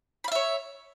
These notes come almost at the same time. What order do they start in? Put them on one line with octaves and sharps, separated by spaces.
B5 F5 E5 C#5